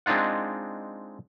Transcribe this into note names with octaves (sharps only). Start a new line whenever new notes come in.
G#3 C4 D4 D#4 F4 F#5